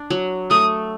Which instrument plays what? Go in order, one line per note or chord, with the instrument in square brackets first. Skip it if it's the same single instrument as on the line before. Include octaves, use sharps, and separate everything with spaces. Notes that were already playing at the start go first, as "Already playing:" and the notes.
Already playing: [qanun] D4
F#3
[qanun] A3 [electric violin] D#6